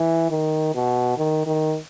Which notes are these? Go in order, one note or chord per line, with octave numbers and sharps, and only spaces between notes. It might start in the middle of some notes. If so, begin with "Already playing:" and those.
Already playing: E3
D#3
B2
D#3
D#3